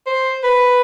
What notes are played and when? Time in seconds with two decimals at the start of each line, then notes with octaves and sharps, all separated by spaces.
0.07 C5
0.44 B4